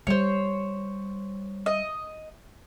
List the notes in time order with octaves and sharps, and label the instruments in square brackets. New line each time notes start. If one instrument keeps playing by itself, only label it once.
[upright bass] G3 [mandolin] C5 C#5
[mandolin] D#5